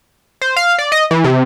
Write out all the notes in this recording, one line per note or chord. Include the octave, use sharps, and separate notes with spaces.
C5
F5
D5
D#5
E3
C3